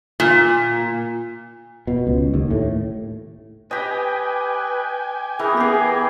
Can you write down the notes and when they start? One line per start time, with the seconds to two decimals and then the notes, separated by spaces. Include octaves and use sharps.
0.20 A#2
1.87 B2
2.07 C#2
2.34 D#2
2.51 A2
3.71 G4 B4 D#5 G5 G#5
5.39 E3 G#4 A#4
5.57 B3 G4 G#4